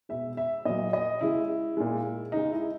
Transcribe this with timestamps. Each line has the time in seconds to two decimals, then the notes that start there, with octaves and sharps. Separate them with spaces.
0.09 B2 G#3 E5
0.37 E5
0.65 A#2 F#3 D#5
0.93 D#5
1.21 C#3 G#3 E4
1.77 A#2 G#3
2.32 C#3 G#3 D#4
2.51 E4